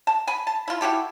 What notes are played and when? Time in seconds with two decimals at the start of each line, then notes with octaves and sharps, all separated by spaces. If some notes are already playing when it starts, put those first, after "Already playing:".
0.07 A5
0.27 G#5 B5
0.47 A5
0.68 E4 F4
0.81 E4 F#4 G4 A4